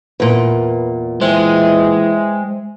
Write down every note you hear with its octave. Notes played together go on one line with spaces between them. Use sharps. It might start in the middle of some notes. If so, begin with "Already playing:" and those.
E2 A#2 B4
E3 G#3 C5 E5 G5